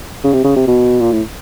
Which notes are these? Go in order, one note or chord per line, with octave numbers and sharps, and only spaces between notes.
C#3
C3
C#3
C3
B2
A#2
A2